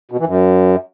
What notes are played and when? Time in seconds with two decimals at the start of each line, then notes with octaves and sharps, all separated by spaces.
0.12 B2
0.19 E3
0.27 F#2